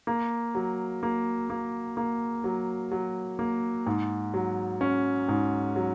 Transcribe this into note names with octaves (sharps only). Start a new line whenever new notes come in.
A#3
F#3
A#3
A#3
A#3
F#3
F#3
A#3
G#2
F#3
C#4
G#2
F#3